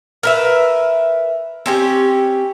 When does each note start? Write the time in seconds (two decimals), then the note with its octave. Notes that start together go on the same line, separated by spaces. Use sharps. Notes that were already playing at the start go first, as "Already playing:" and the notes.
0.23 A#4 B4 E5
1.66 C4 C#4 G4